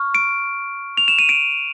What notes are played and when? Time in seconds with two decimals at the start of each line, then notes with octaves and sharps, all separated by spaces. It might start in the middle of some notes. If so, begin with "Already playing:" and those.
Already playing: C#6 F6
0.15 D7
0.97 F7
1.08 E7
1.19 D#7
1.29 D7